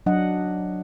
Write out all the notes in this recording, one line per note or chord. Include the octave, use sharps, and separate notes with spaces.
F#3 D4 D#5 F#5